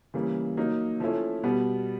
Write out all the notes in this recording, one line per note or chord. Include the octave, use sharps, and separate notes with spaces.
C#3 E3 G3 A#3
F#3 A#3 D#4
F3 A3 C#4 E4
B2 G3 B3